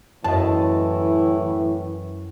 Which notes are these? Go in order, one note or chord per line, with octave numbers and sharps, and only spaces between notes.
F#2 A2 E3 D#5 A5